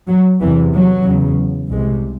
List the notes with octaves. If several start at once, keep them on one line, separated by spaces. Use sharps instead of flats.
F#3
E2 C3 E3
F#3
E2 C#3
C2 C3 G#3